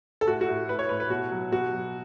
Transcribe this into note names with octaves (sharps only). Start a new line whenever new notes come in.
A4
A2 F#4
F#4
A2
A2 B4
C#5
A2 B4
B4
B2 F#4
F#3
B2 F#4
F#3